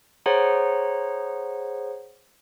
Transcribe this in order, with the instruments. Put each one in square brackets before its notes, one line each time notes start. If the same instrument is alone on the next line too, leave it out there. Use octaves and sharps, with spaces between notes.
[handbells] G#4 C5 C#5 F#5 A#5